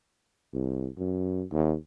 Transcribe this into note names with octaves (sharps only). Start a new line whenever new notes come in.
C2
F#2
D#2